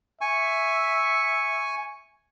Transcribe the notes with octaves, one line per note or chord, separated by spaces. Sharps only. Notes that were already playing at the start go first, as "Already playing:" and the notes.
E5 G#5 C#6